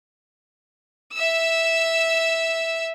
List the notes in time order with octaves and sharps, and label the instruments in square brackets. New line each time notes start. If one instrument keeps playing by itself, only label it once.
[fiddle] E5 E6